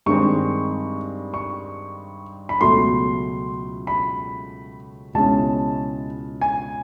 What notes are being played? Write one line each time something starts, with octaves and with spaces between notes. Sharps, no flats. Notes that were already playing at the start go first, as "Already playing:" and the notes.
G2 D#3 G#3 C4 D#4 C#6
C#6
B5
C#2 B2 F#3 A3 C6
B5
C#2 B2 G#3 C#4 E4 A5
G#5